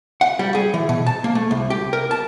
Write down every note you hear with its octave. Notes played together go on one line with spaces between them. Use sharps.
F#5
G3
G#4
E3
B2
A5
A#3
A3
C2
G4
A#4
A5